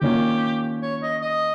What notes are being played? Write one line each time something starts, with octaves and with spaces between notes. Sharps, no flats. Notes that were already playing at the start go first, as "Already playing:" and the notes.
D#3 A#3 C#4 F4 G4
C#5
D#5
D#5